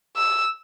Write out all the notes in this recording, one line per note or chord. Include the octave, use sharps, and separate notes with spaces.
E6